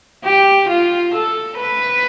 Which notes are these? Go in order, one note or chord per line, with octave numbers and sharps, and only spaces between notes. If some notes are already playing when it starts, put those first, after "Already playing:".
G4
F4
A4
B4